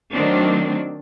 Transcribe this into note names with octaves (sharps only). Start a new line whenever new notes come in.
D#3 F#3 A3 C4 D4